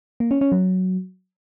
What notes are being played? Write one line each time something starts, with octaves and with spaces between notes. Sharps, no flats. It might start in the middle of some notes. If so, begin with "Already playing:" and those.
A#3
C#4
C#4
F#3